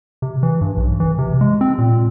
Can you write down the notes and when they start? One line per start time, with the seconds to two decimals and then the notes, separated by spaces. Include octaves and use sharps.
0.22 C3
0.43 E3
0.61 G2
0.77 B1
1.00 E3
1.18 C3
1.41 G#3
1.61 C4
1.78 A#2